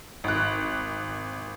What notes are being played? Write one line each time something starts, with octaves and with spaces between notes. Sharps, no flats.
G#1 F#6